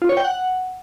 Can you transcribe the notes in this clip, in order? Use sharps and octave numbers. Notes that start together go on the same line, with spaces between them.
F4
C#5
G5
F#5